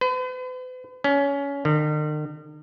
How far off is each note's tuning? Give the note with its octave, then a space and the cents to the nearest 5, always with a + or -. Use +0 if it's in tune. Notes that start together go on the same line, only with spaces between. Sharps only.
B4 +45
C#4 +20
D#3 -45